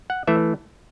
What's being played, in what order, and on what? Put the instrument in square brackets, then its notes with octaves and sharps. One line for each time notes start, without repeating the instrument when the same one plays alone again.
[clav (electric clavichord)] F#5
E3 A3 E5